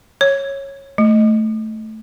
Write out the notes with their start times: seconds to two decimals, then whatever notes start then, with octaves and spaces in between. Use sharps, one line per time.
0.21 C#5
0.98 A3